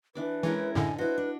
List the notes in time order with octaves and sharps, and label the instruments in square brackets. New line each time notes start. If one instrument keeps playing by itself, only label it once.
[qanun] E3 D4 D6 [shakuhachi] B4
[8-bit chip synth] E3 [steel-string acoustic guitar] G#3 E4 A#4 [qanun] C#4 C#5
[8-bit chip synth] F#2 A2 D3 [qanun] D4 D#5 [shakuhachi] G#5
[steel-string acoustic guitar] E4 C5 [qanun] F#4 [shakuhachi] B4
[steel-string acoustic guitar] D4